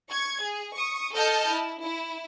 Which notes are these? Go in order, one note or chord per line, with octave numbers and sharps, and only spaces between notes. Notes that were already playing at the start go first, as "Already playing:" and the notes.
C#6 G#6
G#4
C#6 D#6
A4 D#5 A5 F6 G6
E4
E4